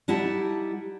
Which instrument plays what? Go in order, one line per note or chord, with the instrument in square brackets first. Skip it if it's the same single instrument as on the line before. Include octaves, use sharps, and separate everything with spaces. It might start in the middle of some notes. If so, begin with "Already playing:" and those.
[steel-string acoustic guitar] G3 D#4 E4 F#5 A5